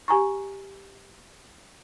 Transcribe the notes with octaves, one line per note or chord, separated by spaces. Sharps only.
G4 G#5 A#5 C#6